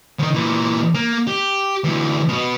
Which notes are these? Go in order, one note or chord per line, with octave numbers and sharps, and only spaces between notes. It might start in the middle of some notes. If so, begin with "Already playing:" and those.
D#3 F3
A#2 E3
A#3
G4
D2 E3
B2 B3